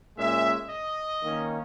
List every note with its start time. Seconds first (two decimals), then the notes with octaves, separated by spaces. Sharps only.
0.16 A#2 G#3 C#4 E5
0.68 D#5
1.21 D#3 A#3 C#4